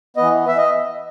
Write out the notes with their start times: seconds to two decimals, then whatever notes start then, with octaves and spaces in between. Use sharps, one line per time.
0.17 E3 B3 D#5
0.48 E5
0.58 D#5